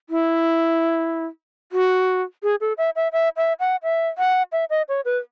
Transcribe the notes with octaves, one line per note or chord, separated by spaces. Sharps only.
E4
F#4
G#4
A4
E5
E5
E5
E5
F#5
E5
F#5
E5
D#5
C#5
B4